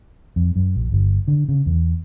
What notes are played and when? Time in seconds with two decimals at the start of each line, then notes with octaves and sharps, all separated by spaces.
0.36 F2
0.56 F#2
0.76 A#1
0.92 G1
1.28 D3
1.49 C#3
1.66 E2